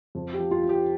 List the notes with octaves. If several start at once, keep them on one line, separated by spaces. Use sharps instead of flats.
F2
G4
F3
F4
F3
G4